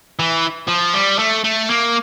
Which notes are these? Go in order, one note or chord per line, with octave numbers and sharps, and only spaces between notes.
E3
F3
G3
A3
A3
A#3